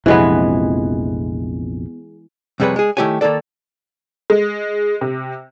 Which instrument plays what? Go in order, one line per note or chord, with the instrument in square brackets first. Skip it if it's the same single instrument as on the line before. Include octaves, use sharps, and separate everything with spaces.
[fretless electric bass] A#1 F2 C3 [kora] E3 G#3 B3
[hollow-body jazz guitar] F2 C3 G3 G#4 B4 C#5
G#3 G#4
D#3 A3 E4 G4 C#5 G#5
D#3 A#3 D#4 A4 D5
[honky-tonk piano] G#3
C3